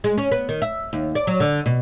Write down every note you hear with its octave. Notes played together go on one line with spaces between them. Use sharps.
G#3
C#4
B3
D#3
E5
D#2
D5
F#3
D3
B2